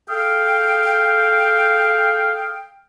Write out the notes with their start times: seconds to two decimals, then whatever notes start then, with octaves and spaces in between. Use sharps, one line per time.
0.09 G#4 A4 F5 G5